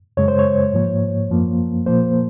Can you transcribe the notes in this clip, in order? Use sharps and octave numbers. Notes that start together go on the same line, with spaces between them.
F#2 C#3 G#3 C#5
C5
C#5
G#2 F3 A#3
F#2 F3 A#3
A#2 F3 A#3 C5